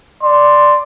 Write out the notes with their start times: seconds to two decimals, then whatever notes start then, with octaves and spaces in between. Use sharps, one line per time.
0.22 D5 C6